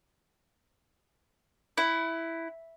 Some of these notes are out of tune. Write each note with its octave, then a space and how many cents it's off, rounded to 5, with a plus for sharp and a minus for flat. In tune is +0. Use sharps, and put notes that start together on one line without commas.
E4 +0 F#5 +30